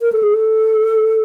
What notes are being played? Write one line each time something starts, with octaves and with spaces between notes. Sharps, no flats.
A#4
A4
G#4
A4